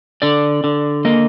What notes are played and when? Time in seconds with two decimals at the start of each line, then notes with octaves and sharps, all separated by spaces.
0.22 D3 D5
0.64 D3
1.05 A#3 D#5